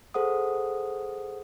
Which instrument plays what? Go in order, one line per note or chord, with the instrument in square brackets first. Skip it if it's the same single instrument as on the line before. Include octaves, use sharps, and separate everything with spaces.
[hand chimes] G#4 A4 C5 F#5 D#6